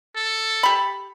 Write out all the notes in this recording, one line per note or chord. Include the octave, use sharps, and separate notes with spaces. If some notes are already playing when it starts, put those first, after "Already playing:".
A4
G4 B5